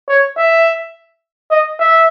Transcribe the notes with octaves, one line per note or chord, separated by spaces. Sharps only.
C#5
E5
D#5
E5